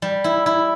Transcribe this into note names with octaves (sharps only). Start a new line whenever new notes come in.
G3
E4
E4